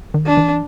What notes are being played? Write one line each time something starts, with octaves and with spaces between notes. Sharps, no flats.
D#3
D4
E3